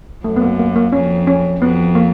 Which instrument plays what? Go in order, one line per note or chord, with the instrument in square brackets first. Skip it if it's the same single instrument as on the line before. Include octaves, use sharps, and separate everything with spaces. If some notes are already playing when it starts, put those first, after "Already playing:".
[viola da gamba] F#2 [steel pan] A3
[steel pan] B3
A#3
A#3
A#3
[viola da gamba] F2 [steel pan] C#4
[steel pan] C#4
[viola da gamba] F2 [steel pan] B3
[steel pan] A#3